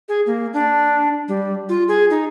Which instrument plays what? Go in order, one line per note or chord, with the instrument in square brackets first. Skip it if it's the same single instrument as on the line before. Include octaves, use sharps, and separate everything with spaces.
[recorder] G#4
A#3
D4
G3
F4
G#4
D#4